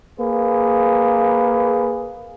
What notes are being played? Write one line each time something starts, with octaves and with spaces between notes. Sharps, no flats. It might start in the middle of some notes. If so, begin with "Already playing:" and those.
A#3 G#4 B4